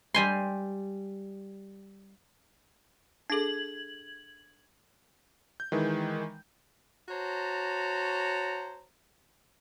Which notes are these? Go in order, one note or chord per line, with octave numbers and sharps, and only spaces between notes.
G3 G#5 C6
D4 G#4 A4 G#6 F#7
G6
D#3 E3 G#3
F#4 C5 C#5 A5 A#5